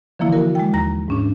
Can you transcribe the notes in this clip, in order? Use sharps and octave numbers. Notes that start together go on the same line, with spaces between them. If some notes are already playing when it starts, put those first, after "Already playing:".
D3 E3 F3 A#3 E4
F#4 A#4
G#3 G5
D#2 A#5 A#6
G#2 C#4 D4